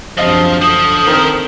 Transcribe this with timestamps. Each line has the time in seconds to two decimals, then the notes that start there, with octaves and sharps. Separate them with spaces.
0.18 F#2 C3 F3 D4 D#5 F5 D#6
0.62 D3 C5 A5 D#6
1.07 D#3 C4 A#4